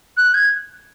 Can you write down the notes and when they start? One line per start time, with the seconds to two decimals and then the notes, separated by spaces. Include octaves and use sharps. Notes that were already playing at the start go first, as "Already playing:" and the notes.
0.17 F#6
0.34 G#6